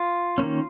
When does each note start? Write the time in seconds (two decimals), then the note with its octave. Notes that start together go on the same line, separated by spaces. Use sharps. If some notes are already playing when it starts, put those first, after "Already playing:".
Already playing: F4
0.38 D#3 A#3 C#4